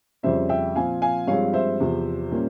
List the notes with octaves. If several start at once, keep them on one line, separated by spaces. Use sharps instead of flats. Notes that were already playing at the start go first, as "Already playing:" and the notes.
F2 C#3 G3 C#4 C5 E5
E5 G5
A#2 F3 C4 F5 G#5
F5 G#5
G2 F3 G#3 C4 C#5 F5
C5 E5
E2 C3 F3
A#2 G3 A#3 C#4